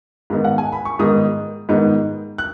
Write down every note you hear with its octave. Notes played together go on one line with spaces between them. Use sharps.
G#2 D#3 B3 D#4
F#5
G#5
B5
C#6
G#2 D#3 B3 D#4 D#6
G#2 D#3 B3 D#4
F#6